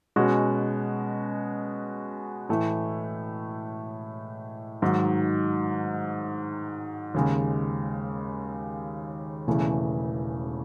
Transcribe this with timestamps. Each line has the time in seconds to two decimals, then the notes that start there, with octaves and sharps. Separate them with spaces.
0.16 B2 G#3 C#4 F#4
2.49 A2 E3 A3
4.82 G#2 D#3 F#3
7.14 D#2 C#3 G#3
9.48 E1 E2 C#3 E3 A3